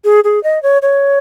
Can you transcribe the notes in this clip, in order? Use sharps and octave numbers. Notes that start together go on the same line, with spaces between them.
G#4
G#4
D#5
C#5
C#5